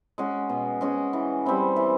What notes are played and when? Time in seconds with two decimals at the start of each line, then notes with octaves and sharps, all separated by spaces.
0.18 G#3 C#4 F#4
0.49 B2
0.81 G#3 C#4 F#4
1.13 E3
1.46 G3 C4 E4
1.76 E3